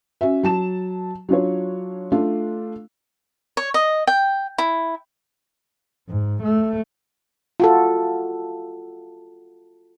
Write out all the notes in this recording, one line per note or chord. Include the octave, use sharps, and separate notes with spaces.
C#4 F#4 E5
F#3 A5 E7
F#3 D4 F4 C#5
A3 D4 F4
C#5
D#5
G5
E4
G#2
A3
F4 F#4 A4